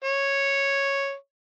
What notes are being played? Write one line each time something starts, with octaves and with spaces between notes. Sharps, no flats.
C#5